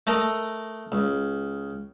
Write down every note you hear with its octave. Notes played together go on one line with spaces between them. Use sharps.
A3 A4 A#4 D#5 A#5
C#2